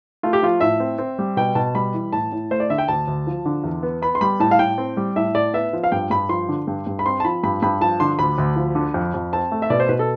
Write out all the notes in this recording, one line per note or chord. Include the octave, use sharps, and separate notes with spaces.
A3 F4
G4
F3 F4
A2 E5
C4
C4
G3
B2 G5
B2 A5
G3 B5
E3
A2 A5
A2
A3 C5
D5
D3 E5
G5
D2 A5
D2
F3
D3
E2
B3
B3 B5
C6
G3 B5
A2 A5
F5
A2 G5
C4
G3
A2 E5
A2 D5
B3 E5
F3
F5
G2 G5
G2 B5
F3 C6
D3
G2
G2
B5
C4 C6
A5
F3 B5
G2 B5
G2 B5
F3 A5
D3 C6
D2 B5
D2
F3
D3
F2
F2
C4 A5
A3
E5
B2 D5
C5
B2 B4
A4